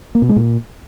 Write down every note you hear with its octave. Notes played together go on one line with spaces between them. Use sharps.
A#3
B2
G#3
A#2